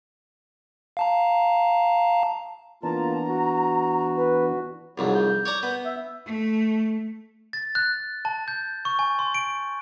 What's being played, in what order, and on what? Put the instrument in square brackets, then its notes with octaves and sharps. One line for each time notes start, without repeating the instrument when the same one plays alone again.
[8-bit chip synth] F5 A5 A#5
[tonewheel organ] E3 B3 D4 [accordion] A#3 F4 A5 [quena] A#5
[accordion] F#4
[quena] B4
[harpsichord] C2 F2 G#2 [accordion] F#3
[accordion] G6
[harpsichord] C#5 D5 A#5
B3
[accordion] E5
[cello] A3
[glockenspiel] A6
F#6
A5
G6
C#6
G#5
C6
D7